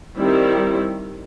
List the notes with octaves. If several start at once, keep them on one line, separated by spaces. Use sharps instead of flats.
D#3 G3 C4 E4